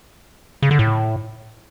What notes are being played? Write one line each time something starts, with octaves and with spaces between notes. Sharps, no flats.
C#3
D3
A2